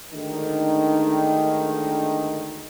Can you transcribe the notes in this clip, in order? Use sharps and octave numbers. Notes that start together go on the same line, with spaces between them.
D2 G#2 D3 D#3